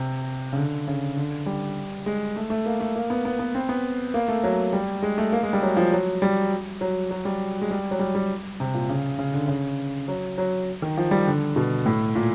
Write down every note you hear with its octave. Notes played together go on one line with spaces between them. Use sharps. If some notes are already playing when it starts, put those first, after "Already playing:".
Already playing: C3
C#3
D3
C#3
D3
G3
G#3
A3
A3
A#3
A3
A#3
B3
B3
B3
C4
B3
A#3
A3
F#3
G3
G#3
A3
A#3
G#3
G3
F#3
F3
F#3
G3
F#3
F#3
G3
G#3
G3
F#3
G3
G3
C3
A#2
C#3
C#3
D3
C#3
F#3
F#3
D#3
F3
G3
D3
B2
A2
A#2